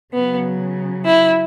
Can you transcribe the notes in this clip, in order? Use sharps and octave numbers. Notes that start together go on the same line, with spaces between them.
C#3 F#3 B3
E4